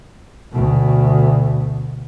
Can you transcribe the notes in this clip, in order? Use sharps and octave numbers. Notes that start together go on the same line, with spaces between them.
D2 B2